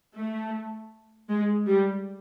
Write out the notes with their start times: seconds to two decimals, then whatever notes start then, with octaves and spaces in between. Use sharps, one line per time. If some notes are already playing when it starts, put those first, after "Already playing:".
0.16 A3
1.29 G#3
1.66 G3